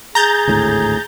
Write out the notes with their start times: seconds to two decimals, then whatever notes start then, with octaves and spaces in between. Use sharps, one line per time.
0.15 G#4 A#5 G6 A6
0.48 G#1 D2 A2